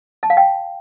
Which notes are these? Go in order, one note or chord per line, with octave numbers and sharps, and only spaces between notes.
A5
F5
G5